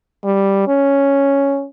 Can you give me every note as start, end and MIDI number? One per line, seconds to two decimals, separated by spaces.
0.24 0.65 55
0.68 1.66 61